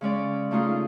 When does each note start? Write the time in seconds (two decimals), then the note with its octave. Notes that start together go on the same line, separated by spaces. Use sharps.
0.01 C#3 G#3 C#4 D5
0.51 C#3 A3 D#4 F4 G#4